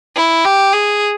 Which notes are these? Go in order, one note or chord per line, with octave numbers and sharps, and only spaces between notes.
E4
G4
G#4